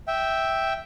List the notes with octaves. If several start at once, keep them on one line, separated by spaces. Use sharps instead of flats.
E5 G5